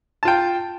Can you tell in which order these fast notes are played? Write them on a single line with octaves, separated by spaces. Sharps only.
A5 F4 G5